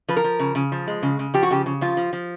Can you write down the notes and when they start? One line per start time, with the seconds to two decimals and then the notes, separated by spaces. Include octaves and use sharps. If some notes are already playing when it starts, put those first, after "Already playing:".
0.09 F3 B4
0.17 A#4
0.24 F3
0.40 C#3
0.55 C#3
0.72 F3
0.87 G#3
1.03 C#3
1.19 C#3
1.34 F3 G4
1.43 F#4
1.51 C#3 G4
1.66 C#3
1.81 F3 F4
1.97 F3
2.13 F3